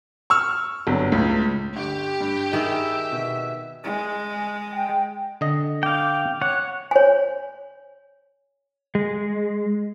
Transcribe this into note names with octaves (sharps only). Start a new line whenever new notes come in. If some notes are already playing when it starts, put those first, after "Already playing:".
C#6 E6 F6
G1 F#3
C#2 A2
G1 G4
G2
D#3 G#4 E5
B2
G#3
G5
D3 D#5
F5 G5 D6
C#5 F#5 F#6
C#5 G#5
G#3